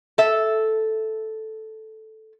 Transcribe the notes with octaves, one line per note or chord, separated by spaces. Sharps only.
A4 E5